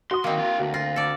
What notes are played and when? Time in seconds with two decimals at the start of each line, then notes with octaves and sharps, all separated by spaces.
0.11 F#4 C6 D#6
0.24 D#3 A#3 C4 D#5
0.38 E4 F5
0.60 D2 F#4
0.74 F4 A#6
0.96 A4 D5